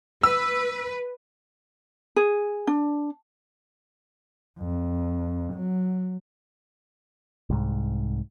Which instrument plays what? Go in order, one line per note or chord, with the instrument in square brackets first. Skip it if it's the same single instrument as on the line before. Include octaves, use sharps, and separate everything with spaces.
[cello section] B4 [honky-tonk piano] E6
[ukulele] G#4
D4
[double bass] F2
F#3
[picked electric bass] C2 G#2